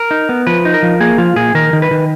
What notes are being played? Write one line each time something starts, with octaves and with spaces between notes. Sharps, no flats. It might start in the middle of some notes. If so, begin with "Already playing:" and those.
Already playing: A#4
D#4
B3
F3 B4
D#4
A#4
F3
A#3 G#4
F3 F4
A#2 G#4
D#3 A#4
D#3
B4
D#3